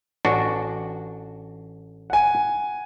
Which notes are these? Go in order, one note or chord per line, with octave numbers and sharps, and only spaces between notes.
A1 D4 F#4
F#5 G#5